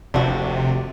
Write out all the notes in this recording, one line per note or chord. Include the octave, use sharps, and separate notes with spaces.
F1 D#2 C3 D4 F#4